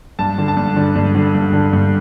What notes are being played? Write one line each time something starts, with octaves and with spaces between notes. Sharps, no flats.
G2 A5
D3
A5
G2
D3
G2
D3
G2
D3
G2